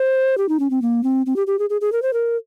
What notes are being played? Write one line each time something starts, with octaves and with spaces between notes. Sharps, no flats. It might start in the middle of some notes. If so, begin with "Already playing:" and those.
Already playing: C5
G4
D#4
C#4
C4
A#3
C4
C4
G4
G4
G#4
G#4
G#4
A#4
C5
A#4